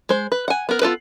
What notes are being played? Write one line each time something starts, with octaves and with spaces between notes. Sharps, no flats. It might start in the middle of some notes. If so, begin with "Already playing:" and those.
G#3 C5
B4
F#5 G#5
B3 A#4
B3 F4 A4 B4